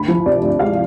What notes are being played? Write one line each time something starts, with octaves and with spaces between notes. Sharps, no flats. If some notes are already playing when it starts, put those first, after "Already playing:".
Already playing: D2 B5
F3
C3 D5
D2
G#3 F5